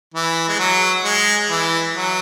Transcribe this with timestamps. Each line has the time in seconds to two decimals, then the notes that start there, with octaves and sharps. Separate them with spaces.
0.14 E3
0.48 G#3
0.59 F#3
1.05 G#3
1.50 E3
1.94 F#3